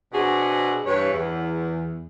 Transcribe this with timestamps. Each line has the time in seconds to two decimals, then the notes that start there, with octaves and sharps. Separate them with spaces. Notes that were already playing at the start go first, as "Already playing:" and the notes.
0.13 B2 C4 D4 F#4 G#4
0.86 G2 E3 B4 C#5
1.12 E2